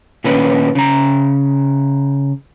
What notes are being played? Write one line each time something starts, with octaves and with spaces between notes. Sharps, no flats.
A#2 D#3 C#4 B4
C#3 A#5